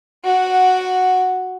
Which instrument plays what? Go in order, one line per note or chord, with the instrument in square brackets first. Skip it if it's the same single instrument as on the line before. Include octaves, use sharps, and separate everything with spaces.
[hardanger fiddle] F#4 F#5